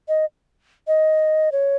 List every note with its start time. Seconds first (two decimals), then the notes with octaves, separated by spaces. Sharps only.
0.08 D#5
0.87 D#5
1.52 C#5